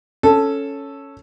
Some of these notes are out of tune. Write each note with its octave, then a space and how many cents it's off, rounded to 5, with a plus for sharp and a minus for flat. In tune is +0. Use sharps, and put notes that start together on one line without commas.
C#4 +0 A4 +0